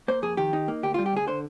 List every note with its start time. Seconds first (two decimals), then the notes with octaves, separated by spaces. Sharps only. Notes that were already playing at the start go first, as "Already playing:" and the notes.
0.08 A#3 C5
0.22 F2 G#4
0.37 D#3 G4
0.53 D#4
0.68 A#3
0.83 D2 G4
0.94 F4
0.98 G3
1.06 G4
1.13 D2 G#4
1.27 D3 C5